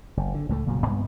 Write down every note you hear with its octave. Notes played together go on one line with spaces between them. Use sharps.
F#1
D3
C#2 A2 F3 A3
F1 A#2 C#3 F#3
C2 G2 B3